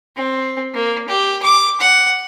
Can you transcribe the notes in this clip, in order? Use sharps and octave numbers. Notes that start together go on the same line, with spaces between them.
C4
A#3
G4
D6
F#5